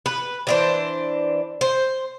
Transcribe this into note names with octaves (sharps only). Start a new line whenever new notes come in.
B4
E3 D4 C5
C5